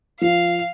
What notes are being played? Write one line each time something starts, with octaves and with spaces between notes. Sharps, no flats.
F3 F5